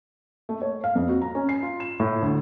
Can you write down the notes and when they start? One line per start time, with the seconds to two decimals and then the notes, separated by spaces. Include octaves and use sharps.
0.49 A3
0.62 C#5
0.84 F5
0.95 F2
1.09 F#4
1.22 A#5
1.35 C#4
1.49 C7
1.63 F4
1.80 E7
2.00 A2
2.22 D2